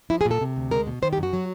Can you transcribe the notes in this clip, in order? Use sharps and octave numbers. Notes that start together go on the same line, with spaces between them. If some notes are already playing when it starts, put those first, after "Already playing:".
F3 E4
G#4
A#2
A4
C3
D2
G#3 A#4
B2
D#3 C5
G4
F#2
F#4
F#3